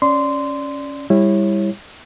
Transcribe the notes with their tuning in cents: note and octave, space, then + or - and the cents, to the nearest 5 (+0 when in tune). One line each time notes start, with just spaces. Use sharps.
C#4 +0 D5 +0 C6 -15
G3 +25 E4 +0 C#5 -25